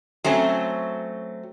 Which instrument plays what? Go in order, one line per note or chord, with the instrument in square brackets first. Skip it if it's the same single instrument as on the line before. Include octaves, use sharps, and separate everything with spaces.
[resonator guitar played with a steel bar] F#3 A3 C4 C#4